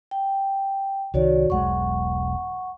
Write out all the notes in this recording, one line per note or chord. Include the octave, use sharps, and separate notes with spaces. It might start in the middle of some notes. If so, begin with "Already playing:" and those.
G5
C2 D#3 F#4 C#5 D5
E1 B1 G#3 F#5 C#6